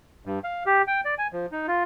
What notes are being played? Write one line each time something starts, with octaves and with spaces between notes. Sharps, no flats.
G2
F5
G4
G5
D5
G#5
F3
D#4
F4